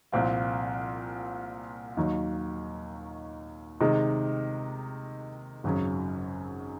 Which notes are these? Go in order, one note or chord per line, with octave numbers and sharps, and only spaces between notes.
C2 A#2 F3 C4 F4
D#2 D#3 F#3
C3 D#3 G#3 D#4
G#1 F#2 C#3 F#3